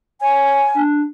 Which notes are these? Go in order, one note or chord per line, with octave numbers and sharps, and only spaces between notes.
C#5 G#5
D4